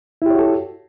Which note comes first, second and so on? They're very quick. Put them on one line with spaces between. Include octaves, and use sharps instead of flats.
E4 G4 C#5 F#4 A4